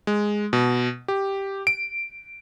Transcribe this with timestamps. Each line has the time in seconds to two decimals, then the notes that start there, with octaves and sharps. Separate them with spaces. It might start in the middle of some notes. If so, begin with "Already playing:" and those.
0.07 G#3
0.53 B2
1.08 G4
1.67 D7